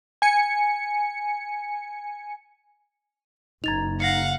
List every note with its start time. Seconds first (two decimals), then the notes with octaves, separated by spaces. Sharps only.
0.22 G#5 C#7
3.64 F#1 D#4 A#5 G#6 A6 F7
4.00 F5 F#5 A#6 C7 C#7